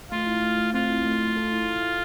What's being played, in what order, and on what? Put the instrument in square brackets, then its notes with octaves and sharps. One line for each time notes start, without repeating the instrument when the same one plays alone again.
[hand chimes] A3 [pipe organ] F4
[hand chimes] E4
A3
A3
[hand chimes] C4 [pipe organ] F4
[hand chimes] E4
A3
A3
A4
E4
A4
E5